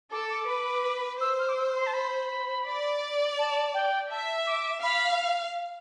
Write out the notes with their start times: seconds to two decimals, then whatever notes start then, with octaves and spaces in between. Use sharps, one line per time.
0.11 A4 D6
0.29 D6
0.48 B4
1.20 C5 E6
1.39 F6
1.48 D6
1.57 E6
1.75 C6
1.86 A5
1.93 B5
2.66 D5
3.38 A5
3.74 G5
4.10 E5 A5
4.46 D6
4.82 F5 B5